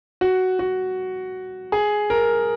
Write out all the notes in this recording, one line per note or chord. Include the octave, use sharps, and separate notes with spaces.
F#4
F#4
G#4
A#4